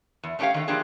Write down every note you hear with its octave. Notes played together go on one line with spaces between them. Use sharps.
E2
A3 C#4 D4 G4 C#5 F5
D3 D#3
E3 F3 A#3 D4 G4 G#4